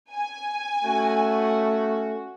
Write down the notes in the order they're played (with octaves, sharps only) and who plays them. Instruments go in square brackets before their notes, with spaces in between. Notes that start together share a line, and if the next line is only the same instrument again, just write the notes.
[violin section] G#5
[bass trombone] A3 [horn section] C#4 F#4